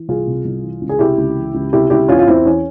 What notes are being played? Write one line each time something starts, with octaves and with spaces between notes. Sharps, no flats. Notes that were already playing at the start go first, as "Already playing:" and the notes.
Already playing: E3
C2 F4 G#4
C3
C2
E3
C#2
G#4
C3 E4 G4
C#2
E3
C#2
C3 E4 G4
C#2 E4 G4
E2 C#4 F4
F4
E2 C4 E4
E3 C#4